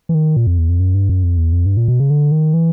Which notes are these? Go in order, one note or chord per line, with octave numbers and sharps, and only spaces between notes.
E3
D#3
A#2
F2
E2
F2
F#2
G2
F#2
F2
E2
F2
G2
A#2
B2
C#3
D3
D#3
E3